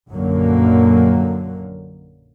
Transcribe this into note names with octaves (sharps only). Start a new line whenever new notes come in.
A#1 F#2 D3 F#3 A#3